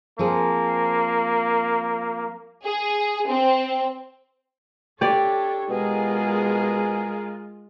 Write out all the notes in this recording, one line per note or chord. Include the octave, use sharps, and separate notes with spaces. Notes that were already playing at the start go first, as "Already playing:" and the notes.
F3 A#3 C4 G#4
G#4
C4
D4 G4 A4 C#5 D5
B2 G#3 F4 G#4 A#4